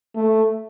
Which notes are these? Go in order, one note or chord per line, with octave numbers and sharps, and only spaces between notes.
A3